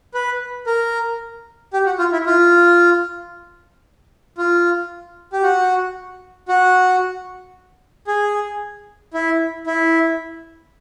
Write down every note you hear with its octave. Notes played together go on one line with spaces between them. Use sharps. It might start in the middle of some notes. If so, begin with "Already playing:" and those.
B4
A#4
G4
F#4
F4
E4
F4
F4
G4
F#4
F#4
G#4
E4
E4